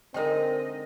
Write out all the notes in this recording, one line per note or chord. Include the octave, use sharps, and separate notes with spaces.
D3 G#3 C4 D#4 A#4 C5 D#5 G5